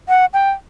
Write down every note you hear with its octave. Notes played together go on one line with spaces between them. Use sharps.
F#5
G5